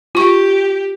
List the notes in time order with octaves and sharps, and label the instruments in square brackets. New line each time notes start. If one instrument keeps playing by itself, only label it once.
[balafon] F4 C#6 [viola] G4